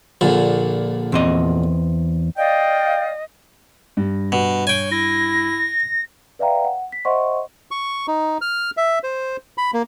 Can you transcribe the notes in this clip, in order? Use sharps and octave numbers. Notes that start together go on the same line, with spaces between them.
A#1 A#2 D3
E2 C4 D#5
D5 D#5 F5 G5
G2
B2
C#5 G5 G#5
E4 A#6
B4 D5 E5 F5 G5 A#5
F#5
B6
C5 D#5 E5 F#5 C6 C#6
C#6
D#4
F6
E5
C5
B5
A#3